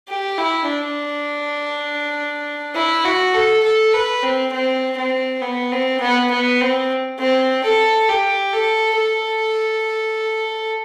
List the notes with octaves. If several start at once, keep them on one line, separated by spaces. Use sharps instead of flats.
G4
E4
D4
E4
F#4
A4
A4
B4
C4
C4
C4
B3
C4
B3
B3
C4
C4
A4
G4
A4
A4